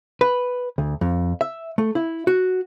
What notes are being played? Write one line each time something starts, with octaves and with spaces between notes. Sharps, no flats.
B4
D2
F2
E5
A3
E4
F#4